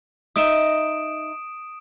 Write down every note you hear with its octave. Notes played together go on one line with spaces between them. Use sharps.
D#4 D#5 E5 D#6 D7 E7